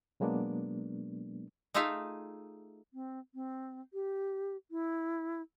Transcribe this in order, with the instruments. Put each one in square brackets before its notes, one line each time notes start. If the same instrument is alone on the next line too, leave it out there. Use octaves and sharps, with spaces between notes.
[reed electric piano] B2 F#3 G#3 A#3 B3 D4
[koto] A3 D#4 F4 G#4 E5 F5
[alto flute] C4
C4
G4
E4